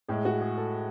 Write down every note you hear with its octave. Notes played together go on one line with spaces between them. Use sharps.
A2 G#3 G#4
F#4
G#4
A4